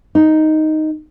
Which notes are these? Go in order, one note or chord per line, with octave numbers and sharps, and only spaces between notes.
D#4